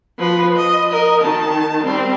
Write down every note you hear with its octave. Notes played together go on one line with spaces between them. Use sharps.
F3 B4
D#5
A#4 D#5
D#3 A5
G3 C4